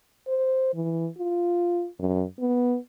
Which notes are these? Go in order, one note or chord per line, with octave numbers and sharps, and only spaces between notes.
C5
E3
F4
F#2
B3